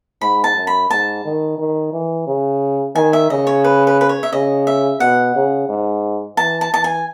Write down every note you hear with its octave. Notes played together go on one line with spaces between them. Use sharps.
G#2 B5
A5
F#2
B5
G#2 A5
D#3
D#3
E3
C#3
D#3 G#5
E5
C#3 D#5
C#5
B4
B4
B4
C#5
E5
C#3 D#5
E5
B2 F#5
C#3
G#2
E3 A5
A5
E3 A5
G#5